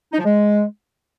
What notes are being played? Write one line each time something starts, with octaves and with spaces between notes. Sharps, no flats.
D#4
F3
G#3